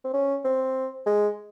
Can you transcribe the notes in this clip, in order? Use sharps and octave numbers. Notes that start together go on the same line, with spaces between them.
C4
C#4
C4
G#3